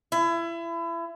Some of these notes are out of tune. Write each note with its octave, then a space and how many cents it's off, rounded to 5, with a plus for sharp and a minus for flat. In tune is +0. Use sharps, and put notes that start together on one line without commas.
E4 +30